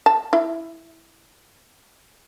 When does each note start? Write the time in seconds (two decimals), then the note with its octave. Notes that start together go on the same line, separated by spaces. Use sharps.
0.06 A5
0.33 E4